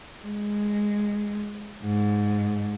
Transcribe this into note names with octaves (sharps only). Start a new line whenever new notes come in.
G#3
G#2